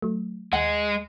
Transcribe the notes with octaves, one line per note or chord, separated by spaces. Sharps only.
F#3 A3
D#2 G#3 F#5